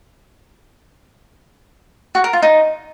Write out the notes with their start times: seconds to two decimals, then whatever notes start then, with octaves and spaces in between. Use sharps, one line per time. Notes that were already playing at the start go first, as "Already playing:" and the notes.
2.15 F#4
2.24 A#4
2.33 F4
2.42 D#4